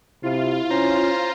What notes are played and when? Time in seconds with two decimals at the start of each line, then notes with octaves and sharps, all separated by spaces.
0.23 C3 E4 F4
0.71 C#4 C5 A#5